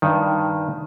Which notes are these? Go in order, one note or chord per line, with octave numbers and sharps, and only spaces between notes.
G2 D#3